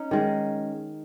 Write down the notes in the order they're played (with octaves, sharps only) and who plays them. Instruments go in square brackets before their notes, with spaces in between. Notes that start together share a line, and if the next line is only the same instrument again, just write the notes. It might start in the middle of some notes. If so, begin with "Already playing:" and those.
Already playing: [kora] C#4 D#4
D#3 G#3